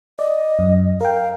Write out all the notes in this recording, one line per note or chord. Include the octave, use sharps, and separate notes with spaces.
D5 D#5
F#2
A#4 F5 G5